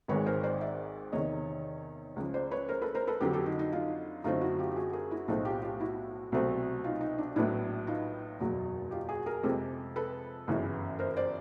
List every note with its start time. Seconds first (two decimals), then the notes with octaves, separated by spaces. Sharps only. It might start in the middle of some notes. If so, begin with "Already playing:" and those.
0.08 G#1 G#2 D#3 G#3 B4 C#5
0.26 A#4 C5
0.43 C5 D5
0.61 D5 E5
1.12 E2 C3 D#3 C#5 D#5
2.16 C#2 C#3 F3
2.34 C5 D5
2.51 B4 C#5
2.69 A#4 C5
2.81 A4 B4
2.95 A#4 C5
3.07 A4 B4
3.21 F2 D3 F#3 G4 A4
3.33 G4 A4
3.46 D#4
3.59 D#4
3.72 D#4 F4
4.24 F#2 D3 F#3 A3 C4 D#4 F4
4.41 E4 F#4
4.59 F4 G4
4.71 G4
4.76 F#4 G#4
4.93 G#4 A#4
5.11 E4 F#4
5.28 B1 A2 F3 A3 C4 D#4 F4
5.45 F4 G4
5.62 F4 G4
5.80 E4 F#4
6.32 C2 B2 F#3 A3 C4
6.84 D#4 F4
7.01 D#4
7.18 D4
7.36 A#1 A2 F#3 B3 D4 E4
7.87 D#4 F4
8.40 F#1 E2 B2 F#3
8.91 F4 G4
9.09 F#4 G#4
9.26 G#4 A#4
9.43 F2 C3 F3 G#3 C4 G4 A4
9.96 A4 B4
10.48 G1 F#2 C#3 E3
10.99 A#4 C5
11.17 C5 D5